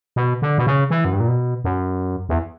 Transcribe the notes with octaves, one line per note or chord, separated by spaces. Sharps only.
B2
D3
B2
C#3
E3
F#2
G2
A#2
B2
F#2
E2